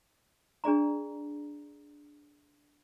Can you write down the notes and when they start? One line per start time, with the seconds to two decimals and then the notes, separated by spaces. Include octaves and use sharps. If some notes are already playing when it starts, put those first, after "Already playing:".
0.64 D4 G#4 D5 A#5